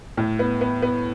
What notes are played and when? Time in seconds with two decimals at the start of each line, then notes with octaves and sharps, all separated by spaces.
0.17 A2
0.39 B3
0.61 B3
0.82 B3